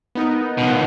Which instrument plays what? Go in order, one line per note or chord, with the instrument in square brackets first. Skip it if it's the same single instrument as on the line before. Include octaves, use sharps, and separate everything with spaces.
[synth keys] B3 D#4 A#4
[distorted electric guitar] C#2 B2